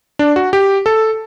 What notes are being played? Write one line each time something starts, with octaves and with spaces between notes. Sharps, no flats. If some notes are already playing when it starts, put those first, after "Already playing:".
D4
F#4
G4
A4